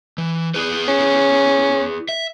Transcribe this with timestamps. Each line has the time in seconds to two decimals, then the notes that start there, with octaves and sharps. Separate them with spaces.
0.18 E3
0.54 E4 G#4 B4
0.88 C#4
2.09 E5